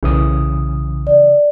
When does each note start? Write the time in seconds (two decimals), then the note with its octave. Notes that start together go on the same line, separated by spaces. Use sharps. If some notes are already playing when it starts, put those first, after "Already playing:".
0.03 B1 C#3 E3 D#6
1.07 D5